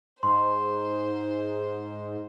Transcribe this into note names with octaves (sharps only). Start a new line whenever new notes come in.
G#2 C5 C6